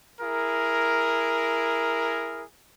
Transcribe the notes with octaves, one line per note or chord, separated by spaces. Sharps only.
E4 G#4 A#4